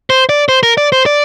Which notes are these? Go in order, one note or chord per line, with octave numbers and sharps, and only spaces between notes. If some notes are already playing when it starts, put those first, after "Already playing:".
C5
D5
C5
A#4
D5
C5
D5